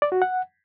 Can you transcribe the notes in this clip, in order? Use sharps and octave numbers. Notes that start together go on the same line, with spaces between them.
D5
F#4
F#5